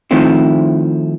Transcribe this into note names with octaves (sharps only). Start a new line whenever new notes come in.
D#3 F3 A3 C4 E4